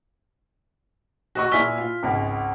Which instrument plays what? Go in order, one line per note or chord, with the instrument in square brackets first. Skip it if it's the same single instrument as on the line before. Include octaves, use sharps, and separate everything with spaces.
[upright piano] F#4 D#5 C#6
A#2 E4 G#5 F6 B6 G7
F4
G#1 C#2